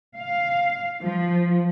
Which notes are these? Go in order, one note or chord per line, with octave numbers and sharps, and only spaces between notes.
F5
F3